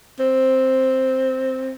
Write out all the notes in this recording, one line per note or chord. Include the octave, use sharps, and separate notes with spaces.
C4